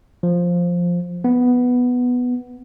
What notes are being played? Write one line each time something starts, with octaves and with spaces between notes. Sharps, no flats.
F3
B3